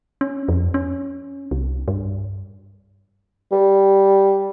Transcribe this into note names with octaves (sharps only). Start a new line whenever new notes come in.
C#4
F2
C#4
C2
G2
G3